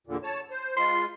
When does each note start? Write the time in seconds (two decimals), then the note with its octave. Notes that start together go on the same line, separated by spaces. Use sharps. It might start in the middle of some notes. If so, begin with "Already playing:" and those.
0.07 E2 A#2 D3
0.23 C#5 A5
0.51 C5
0.77 G#3 F4 C6